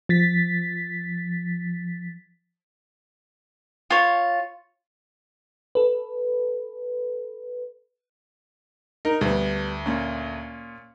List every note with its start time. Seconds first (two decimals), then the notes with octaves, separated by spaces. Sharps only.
0.09 F3 A6 B6
3.90 F4 C#5
5.75 A4 B4
9.05 D#4 A#4
9.21 D2 G3 B3
9.86 A#2 C#4